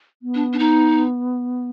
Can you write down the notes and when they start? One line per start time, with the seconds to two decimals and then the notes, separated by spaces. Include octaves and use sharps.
0.23 B3
0.35 D4
0.53 D4
0.59 D#4